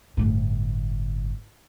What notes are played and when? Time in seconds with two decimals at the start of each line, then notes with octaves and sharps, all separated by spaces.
0.17 G1 A2